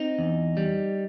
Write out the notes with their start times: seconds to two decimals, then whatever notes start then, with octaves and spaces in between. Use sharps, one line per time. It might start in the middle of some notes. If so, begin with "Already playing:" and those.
Already playing: C4 D#4
0.19 E2
0.57 G3